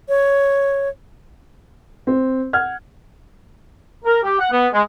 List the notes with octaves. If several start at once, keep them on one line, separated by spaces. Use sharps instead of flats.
C#5
C4
F#5 F6 G#6
A#4
G4
F#5
B3
G#3